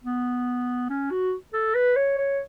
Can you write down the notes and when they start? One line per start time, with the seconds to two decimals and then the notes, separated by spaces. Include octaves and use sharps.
0.04 B3
0.90 C#4
1.11 F#4
1.53 A4
1.75 B4
1.96 C#5
2.18 C#5